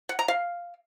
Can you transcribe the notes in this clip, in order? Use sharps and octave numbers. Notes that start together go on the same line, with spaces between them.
F#5
A#5
F5